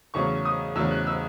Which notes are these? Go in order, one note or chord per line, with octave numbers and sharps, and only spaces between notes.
E2 C#3 F#3 A3 C#4 C#6
D#6
E2 C#3 F#3 A3 C#4 E6
F#6
E6